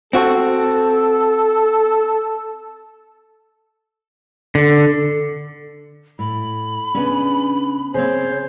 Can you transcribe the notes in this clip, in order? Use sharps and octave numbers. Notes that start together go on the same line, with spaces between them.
C4 F#4 A4
D3
A2 B5
C#3 B3 C#4 D4 G#5
C#3 A#3 C4 G#4 C5 C#5